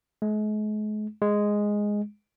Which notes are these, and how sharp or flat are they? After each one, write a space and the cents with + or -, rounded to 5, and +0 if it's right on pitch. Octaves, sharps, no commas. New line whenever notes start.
G#3 +40
G#3 -5